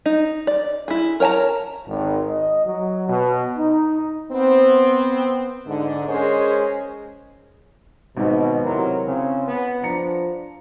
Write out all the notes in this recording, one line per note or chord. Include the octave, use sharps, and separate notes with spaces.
D#4
D5
E4 G#4
A#4 C#5 G5 A5 A#5
G#1
D#5
F#3
B2
D#4
B3 C4
G#2 D3
G#3 C#4 G#4 A#4 C5 C#5
G#1 G#2 B2 D#5
C3 F#3 E4 A#4 C6
C#3 C4
B3
F3 D4 A#5 C#7